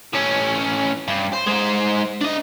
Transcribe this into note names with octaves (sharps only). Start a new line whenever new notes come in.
A2 C#4
G2
C5
G#3 C5
D4 D#5